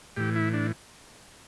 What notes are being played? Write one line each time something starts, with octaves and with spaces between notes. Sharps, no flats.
A2 E3 G4
E4
D4